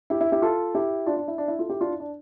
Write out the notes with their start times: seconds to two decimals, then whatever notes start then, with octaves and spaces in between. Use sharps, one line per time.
0.10 E4 G4
0.21 E4
0.32 E4 G4
0.42 F4 A4
0.75 E4 G4
1.06 D4 F4
1.17 D4
1.28 E4
1.38 D4
1.48 E4
1.59 F4 A4
1.70 E4 G4
1.81 D4 F4
1.90 E4
2.00 D4